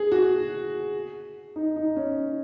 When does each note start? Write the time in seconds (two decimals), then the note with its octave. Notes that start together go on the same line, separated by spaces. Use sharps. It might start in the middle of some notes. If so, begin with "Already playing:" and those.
Already playing: G#4
0.12 F#4
1.56 D#4
1.76 D#4
1.96 C#4